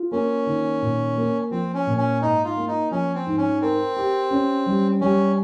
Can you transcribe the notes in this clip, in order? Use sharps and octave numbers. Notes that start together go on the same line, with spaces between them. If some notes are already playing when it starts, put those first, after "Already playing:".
Already playing: F4
A#3 C#4
D#3
A#2
A#3
F3 C4
C#4
A#2
C#4
G#2 D#4
F4
A#3
D#4
F3 C#4
C4
G#2
C#4
C4 A#4
G4
C#4
G3
G3 C#4